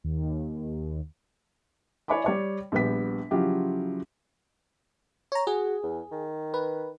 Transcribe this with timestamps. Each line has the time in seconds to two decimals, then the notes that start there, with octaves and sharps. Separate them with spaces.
0.04 D#2
2.08 E4 C#5 D5 G#5 B5 D6
2.24 G3 C#5 D5
2.72 A#1 G3 B3 B6
3.31 C#3 F3 F#3 E4 F4 G4
5.32 C#5 A#5
5.47 F#4 G#4
5.83 E2
6.12 D#3
6.54 B4